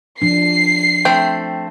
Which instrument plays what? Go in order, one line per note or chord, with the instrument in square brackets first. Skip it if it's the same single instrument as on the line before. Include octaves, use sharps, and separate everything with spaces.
[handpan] F3 D4 [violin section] C7
[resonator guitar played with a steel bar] A3 C4 [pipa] G5